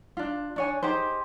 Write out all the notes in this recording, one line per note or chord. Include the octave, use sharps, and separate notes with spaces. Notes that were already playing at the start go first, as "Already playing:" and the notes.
D4 F4
D4 C#5 G#5
D#4 G4 G#4 C5